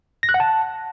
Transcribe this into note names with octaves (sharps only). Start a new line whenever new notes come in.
A#6
F#6
F#5
A5